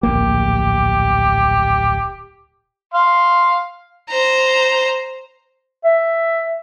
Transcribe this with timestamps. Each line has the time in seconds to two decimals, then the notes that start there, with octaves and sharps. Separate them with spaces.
0.03 D1 A#1 A#3 G4
2.94 F5 C6
4.10 C5 A#5
5.84 E5